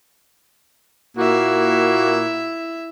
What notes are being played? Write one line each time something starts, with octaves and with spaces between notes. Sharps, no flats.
A#2 A#3 E4 F#4 E5